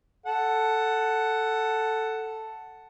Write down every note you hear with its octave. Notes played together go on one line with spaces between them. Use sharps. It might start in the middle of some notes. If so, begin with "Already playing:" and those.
A4 F#5